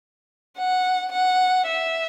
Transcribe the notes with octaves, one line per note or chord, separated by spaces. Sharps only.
F#5
F#5
E5